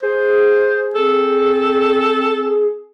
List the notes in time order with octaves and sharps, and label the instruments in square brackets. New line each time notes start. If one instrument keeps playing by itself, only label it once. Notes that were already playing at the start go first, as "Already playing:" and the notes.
[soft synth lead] G#4 [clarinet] C5
[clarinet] C4 [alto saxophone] A4